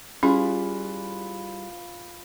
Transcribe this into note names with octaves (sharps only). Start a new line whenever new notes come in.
G3 C#4 E4 F4 G#4 B4